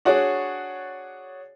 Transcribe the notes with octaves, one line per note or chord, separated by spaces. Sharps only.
D4 F#4 G#4 C#5 D5